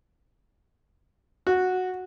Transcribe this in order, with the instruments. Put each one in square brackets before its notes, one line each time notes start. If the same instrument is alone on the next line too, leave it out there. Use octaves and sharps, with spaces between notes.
[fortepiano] F#4